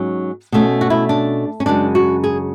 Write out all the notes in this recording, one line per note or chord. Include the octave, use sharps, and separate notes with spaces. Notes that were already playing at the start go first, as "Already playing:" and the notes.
Already playing: G#2 F#3 C#4
B2 A3 C#4
F#4
E4
D4
C#4
F#2 C#3 G#3 D4
F#4
G#4